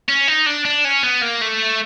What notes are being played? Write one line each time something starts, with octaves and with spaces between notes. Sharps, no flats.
C#4
D#4
D4
D4
C#4
B3
A#3
A3